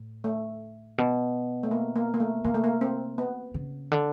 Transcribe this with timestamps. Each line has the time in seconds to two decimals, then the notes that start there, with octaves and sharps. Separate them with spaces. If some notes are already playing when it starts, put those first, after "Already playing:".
Already playing: A2
0.24 A3
0.98 B2
1.63 A3
1.71 A#3
1.96 A#3
2.14 A#3
2.20 A3
2.44 C3 A#3
2.54 A3
2.64 A#3
2.81 C4
3.18 B3
3.54 C#3
3.91 D3